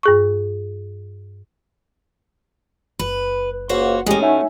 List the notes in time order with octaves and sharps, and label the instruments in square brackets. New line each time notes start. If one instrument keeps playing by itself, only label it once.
[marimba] G2 G#4 C#6
[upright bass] F#1 [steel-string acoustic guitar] B4
[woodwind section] C#2 A#3 [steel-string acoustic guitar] F#4 C5 C#5
[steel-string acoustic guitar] A2 C#4 [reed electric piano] G#3 G4 [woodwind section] G#4 D#5
[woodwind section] F#3 A3 [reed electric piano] D#4 E5 G#5